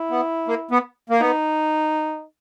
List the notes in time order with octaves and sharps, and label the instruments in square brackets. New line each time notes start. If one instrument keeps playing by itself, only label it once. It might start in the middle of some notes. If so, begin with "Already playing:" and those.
Already playing: [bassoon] E4
[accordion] B3
A#3
B3
A#3
[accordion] B3 [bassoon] D#4